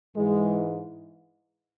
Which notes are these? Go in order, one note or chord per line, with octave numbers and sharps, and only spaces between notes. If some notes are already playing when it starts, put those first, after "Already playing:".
G#2 E3 G#3